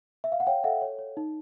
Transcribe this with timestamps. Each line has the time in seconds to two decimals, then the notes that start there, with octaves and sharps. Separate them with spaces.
0.24 E5
0.32 F5
0.40 F#5
0.47 C#5 F5 G5
0.64 A4 E5 F#5
0.82 C#5
0.99 C#5
1.17 D#4